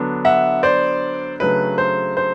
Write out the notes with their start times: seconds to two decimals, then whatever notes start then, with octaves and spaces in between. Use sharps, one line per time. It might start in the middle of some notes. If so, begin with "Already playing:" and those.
Already playing: D3 F#3 B3 D4
0.25 E5 F#5
0.63 C5 D5
1.40 C#3 F#3 A3 D4 B4
1.78 C5
2.17 C5